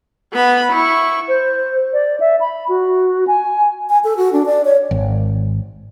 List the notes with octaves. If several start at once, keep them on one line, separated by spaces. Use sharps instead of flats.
B3 B5
E4 C#6
C5
D5
E5
B5
F#4
G#5
G#5
A4
F#4
D4
D5
C#5
G#1